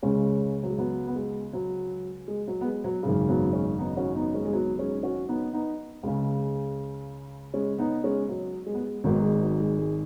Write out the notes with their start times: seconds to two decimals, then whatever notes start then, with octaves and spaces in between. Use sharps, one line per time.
0.03 C#2 C#3 G#3 C#4
0.63 F#3
0.70 G#3
0.78 F#3 B3
1.08 B3
1.15 G#3
1.53 F#3
2.28 G#3
2.47 F#3
2.61 B3
2.65 G#3
2.84 F#3
3.03 G#1 F#2 C#3
3.28 F#3 B3
3.53 G#3 C#4
3.78 B3 D#4
3.97 C#4 F#4
4.15 B3 D#4
4.34 G#3 C#4
4.45 G#3
4.53 F#3 B3
4.78 G#3 C#4
5.03 C#4 F#4
5.28 B3 D#4
5.53 B3 D#4
6.03 C#2 C#3 G#3
7.54 G#3 C#4
7.78 B3 D#4
8.04 G#3 C#4
8.29 F#3
8.67 G#3
8.74 B3
8.81 G#3
9.04 G#1 G#2 D#3 F#3 B3
9.23 G#3
9.42 F#3
9.60 G#3
9.79 G#3